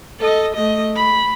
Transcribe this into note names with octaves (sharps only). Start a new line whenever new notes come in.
A4 D#5
A3 D#5
B5